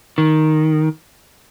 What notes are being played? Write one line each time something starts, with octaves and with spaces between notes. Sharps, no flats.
D#3